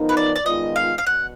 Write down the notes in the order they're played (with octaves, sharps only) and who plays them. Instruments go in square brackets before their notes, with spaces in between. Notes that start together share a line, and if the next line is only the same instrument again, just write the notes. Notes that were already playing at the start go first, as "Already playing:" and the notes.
Already playing: [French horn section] F3 B3 D#4 A#4
[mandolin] B4
D5
D5
[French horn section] D#3 G#3 B3 F4 [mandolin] D#5
[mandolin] F5
F5
[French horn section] B2 [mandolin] F#5